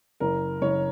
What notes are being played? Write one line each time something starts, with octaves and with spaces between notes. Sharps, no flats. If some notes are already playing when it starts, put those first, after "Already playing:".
F#1 A#4
F#1 C#5